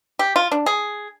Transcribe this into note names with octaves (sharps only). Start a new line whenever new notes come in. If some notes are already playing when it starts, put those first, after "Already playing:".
G4
F4
D4
G#4